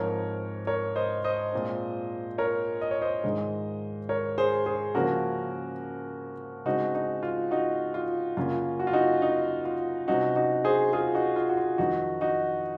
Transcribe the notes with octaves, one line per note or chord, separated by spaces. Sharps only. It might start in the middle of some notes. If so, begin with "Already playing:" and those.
Already playing: G#2 F3 C4 A#4 C#5
A#4 C#5
C5 D#5
C5 D#5
A#2 G#3 C4
A#4 C#5
D#5
C#5
C5 D#5
G#2 D#3 G#3
A#4 C#5
G#4 C5
G#4 C5
C#3 F3 A#3 C#4 F#4 A#4
C#3 G#3 C4 D#4 F#4
D#4
F4
D#4 F#4
F4
F#2 C#3 F#3 A#3 C#4 F4
F#4
F4
D#4 F#4
D#4
F4
C3 F#3 C#4 D#4 F#4
D#4 F#4
G#4 C5
F4 G#4
D#4 F#4
F4
F#4
F4
F2 D#3 F#3 D#4 F#4
D#4 F#4